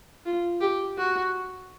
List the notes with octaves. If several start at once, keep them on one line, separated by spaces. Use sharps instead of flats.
F4
G4
F#4